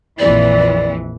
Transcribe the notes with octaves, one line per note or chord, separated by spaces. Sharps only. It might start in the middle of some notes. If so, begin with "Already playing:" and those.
A#1 F2 E3 D5